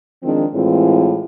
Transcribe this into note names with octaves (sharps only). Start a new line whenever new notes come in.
D#3 F3 G#3 C4 D4
A2 E3 G#3 C4 F4